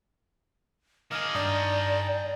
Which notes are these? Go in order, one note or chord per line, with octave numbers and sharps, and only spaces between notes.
D#3 G#4 D#5 F5 D6 F6
G2 D5 G5 A5 A#5 D#6